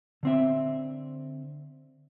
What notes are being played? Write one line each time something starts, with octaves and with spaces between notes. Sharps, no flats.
D3 C4 E5